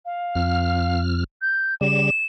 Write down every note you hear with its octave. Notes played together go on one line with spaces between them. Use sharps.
F5
F2 F6
G6
C#3 G3 E7